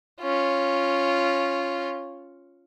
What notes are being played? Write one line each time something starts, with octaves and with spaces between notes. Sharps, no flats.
C#4 F4